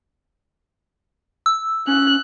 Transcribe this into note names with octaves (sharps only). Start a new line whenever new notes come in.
E6
C#4 F#6